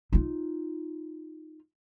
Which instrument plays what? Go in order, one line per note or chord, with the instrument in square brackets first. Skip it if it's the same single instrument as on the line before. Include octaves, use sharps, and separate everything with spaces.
[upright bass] D#4 F4